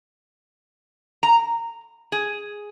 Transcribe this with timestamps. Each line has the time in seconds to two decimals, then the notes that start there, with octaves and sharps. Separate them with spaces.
1.23 A#5
2.12 G#4